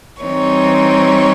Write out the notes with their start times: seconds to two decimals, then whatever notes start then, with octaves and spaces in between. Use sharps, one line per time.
0.21 E3 G3 C4 D#4 C#5